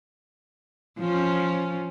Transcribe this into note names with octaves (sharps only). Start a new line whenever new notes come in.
F3 C#4